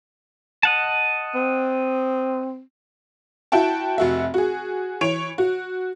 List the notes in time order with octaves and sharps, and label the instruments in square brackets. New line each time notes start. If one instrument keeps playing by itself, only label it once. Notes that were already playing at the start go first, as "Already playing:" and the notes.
[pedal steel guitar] D#5 F#5 A5
[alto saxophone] C4
[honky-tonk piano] E4 F#4 G5 A5
F1 F#4 E5
F#4 G#4
E3 C#5 D7 F7
F#4